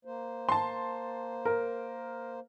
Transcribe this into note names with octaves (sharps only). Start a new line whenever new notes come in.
A#3 C5
A5 C6
A#4